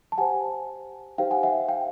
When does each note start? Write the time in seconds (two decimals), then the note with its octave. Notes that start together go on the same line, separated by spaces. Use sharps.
0.12 A5
0.18 G4 C5 F#5 G#5
1.18 D#4 G4 C5 F5 G5
1.31 F#5 G#5
1.43 E5 F#5
1.68 F5 G5